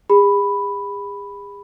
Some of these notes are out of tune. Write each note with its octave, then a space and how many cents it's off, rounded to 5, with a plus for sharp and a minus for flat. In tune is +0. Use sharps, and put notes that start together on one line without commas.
G#4 -45 B5 +0